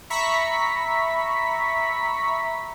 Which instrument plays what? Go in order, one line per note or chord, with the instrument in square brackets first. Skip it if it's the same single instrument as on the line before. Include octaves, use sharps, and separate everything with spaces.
[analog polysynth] E5 A#5 B5 C#6 B6